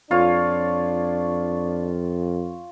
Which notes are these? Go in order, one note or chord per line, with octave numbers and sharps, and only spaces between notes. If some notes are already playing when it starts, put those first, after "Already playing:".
F2 D4 F4 C#5